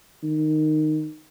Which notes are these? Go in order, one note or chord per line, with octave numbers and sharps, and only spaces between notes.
D#3